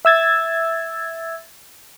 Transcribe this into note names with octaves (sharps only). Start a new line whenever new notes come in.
E5 E6 G#6 A6